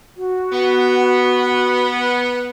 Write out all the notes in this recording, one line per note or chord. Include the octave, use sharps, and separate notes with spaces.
F#4
B3